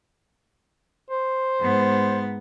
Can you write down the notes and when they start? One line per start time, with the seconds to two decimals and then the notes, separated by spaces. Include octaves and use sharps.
1.11 C5
1.60 G#2 B3